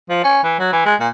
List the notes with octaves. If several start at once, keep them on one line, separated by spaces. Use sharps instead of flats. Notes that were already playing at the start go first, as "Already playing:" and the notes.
F3
C#4
E3
F#3
E3
G#3
A#2